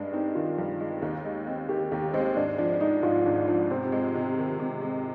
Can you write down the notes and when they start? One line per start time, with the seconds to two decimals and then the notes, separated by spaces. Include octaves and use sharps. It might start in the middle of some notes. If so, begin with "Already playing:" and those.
Already playing: G2 G#3 D4
0.13 C4 D#4
0.35 D#3 F4
0.58 G2
0.80 G#3
1.02 D#2
1.25 G#3
1.47 C4
1.69 D#3 G4
1.92 D#2 G4
2.13 G#3 C4
2.36 G#1 D4
2.58 F3 D4
2.80 G#3 D#4
3.03 G#2 F4
3.25 G#1 D4
3.48 F3 D4
3.70 C3 C4
3.92 G#3
4.15 C3
4.37 D#3
4.60 C3
4.82 G#3